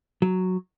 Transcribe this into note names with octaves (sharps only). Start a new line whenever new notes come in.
F#3